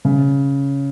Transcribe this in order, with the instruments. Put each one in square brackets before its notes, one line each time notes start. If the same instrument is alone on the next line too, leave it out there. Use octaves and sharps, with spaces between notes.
[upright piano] C#3